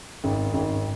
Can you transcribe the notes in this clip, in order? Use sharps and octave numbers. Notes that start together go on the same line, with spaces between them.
G#1
G#1